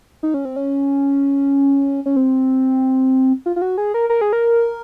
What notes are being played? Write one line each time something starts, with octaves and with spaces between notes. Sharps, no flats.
D#4
C#4
C4
C#4
C#4
C4
F4
F4
F#4
G#4
A#4
A#4
G#4
A#4